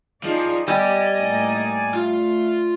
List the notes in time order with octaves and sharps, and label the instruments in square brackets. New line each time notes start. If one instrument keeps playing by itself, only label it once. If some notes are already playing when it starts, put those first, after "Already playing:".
[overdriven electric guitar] F3 F4 [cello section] D#4 G#4 D5
[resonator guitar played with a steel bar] G3 [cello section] B3 G4 [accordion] D5 G#5 [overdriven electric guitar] D#5
[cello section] A2 A#3 D#4
[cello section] A3 [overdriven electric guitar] F4